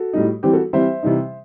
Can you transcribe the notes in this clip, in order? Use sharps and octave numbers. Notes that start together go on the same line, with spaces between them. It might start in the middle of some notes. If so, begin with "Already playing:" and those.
Already playing: F#4 A4
A2 G3 D#4
E3 G3 C4 G4
F#4 A4
E3 G3 C4 C5 E5
C3 E3 G3 D#4